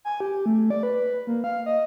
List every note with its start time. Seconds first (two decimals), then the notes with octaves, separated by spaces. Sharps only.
0.05 G#5
0.20 G4
0.46 A3
0.70 D5
0.83 B4
1.27 A#3
1.44 F5
1.66 D#5